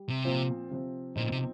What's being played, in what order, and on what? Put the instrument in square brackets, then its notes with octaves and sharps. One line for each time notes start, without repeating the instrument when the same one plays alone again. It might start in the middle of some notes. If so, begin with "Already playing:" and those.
Already playing: [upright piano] G3
[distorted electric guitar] C3
[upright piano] A#2 F3 C4 F4 C5
C3 F3 C4
[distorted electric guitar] A#2 [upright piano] F3 C4 D#4
[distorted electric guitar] C3